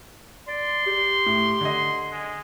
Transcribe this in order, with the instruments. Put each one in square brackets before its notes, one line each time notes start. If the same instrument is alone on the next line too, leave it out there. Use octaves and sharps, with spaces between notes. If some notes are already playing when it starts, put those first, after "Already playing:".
[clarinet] D5 [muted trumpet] C6
[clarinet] G4
[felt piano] A2
D3 D#5
[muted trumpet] G#3